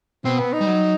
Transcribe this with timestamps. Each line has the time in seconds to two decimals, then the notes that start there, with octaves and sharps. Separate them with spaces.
0.25 B2 C4
0.39 B3
0.53 D#4
0.61 G3
0.67 F#3